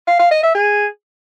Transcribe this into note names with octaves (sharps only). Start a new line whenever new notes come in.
F5
F5
D#5
E5
G#4